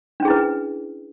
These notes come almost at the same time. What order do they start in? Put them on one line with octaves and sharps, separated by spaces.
D4 C#4 G#4 E4 B4